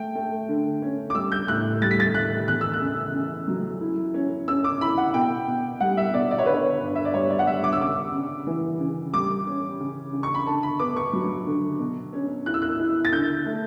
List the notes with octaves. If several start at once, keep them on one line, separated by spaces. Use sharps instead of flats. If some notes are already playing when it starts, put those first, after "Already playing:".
Already playing: A3 G5
A3
D3
C#4
D6
G3 E6
G6
A2 F#6
G3 A6
B6
A6
A2 F#6
E2 F#6
E6
F#6
C#3
C#3
F#3
E4
C#4
C#4 E6
D6
E4 B5
F#5
B2 G5
B2
G3 F#5
E5
B2 D5
D5
C#5
D3 B4
C#5
G2
E5
D5
G3 C#5
D5
F#5
G3 E5
D6
E6
C#3 D6
C#3
E3
C#3
G3 D6
C#4
C#3
C#3
C#6
B5
D3 A5
B5
B3 D6
C#6
F#3
D3
B2
C#4
E4 F#6
E6
F#6
E4
A6
D3 G6
A3